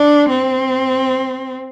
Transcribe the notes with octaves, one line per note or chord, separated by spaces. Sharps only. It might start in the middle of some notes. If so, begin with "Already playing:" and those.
Already playing: D4
C4